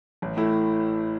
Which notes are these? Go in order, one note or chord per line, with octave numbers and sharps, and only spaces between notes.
A1
A2 A3 E4